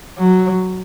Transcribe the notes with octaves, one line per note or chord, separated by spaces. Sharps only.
F#3